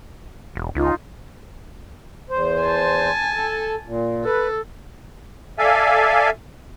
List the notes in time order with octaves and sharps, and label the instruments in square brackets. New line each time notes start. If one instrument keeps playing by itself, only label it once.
[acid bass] E1
[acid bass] C#2 [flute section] D#4 F4
[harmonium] E2 C5
[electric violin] G#5 A5
[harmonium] A4
A#2
[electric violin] A4 [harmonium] B4
[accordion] A4 D5 E5 F5 G#5